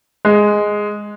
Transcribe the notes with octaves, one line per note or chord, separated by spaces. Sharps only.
G#3